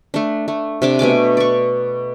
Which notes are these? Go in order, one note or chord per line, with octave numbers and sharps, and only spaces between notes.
A3 D4
A3
C3 D4 D6
B2 A3 G#5 D6
D5 C#6